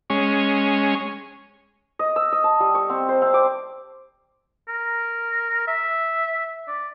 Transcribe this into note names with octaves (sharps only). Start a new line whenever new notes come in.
G#3 C#4
D#5
E6
D#5
A5
G3
C#6
C4
C5
C4
D6
A#4
E5
D5